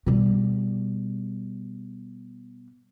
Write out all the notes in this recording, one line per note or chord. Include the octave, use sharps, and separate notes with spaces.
B2 G3